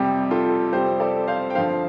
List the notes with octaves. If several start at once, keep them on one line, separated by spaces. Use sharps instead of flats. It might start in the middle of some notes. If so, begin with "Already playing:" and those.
Already playing: F2 C3 G3 G4
F4 A4
F2 C3 G3 G4 C5
A4 D5
C5 F5
G5
G2 D3 F3 C5 F5